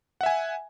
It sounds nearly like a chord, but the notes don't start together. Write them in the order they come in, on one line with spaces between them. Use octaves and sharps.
F#5 E5 G#5